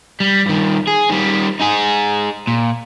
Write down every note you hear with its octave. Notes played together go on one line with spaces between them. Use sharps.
G3
G2 D#3
G#4
D#3 G3
D#4 G#4
A#2